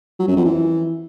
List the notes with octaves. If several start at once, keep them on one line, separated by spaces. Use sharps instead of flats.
F#3
F#2
F2
E3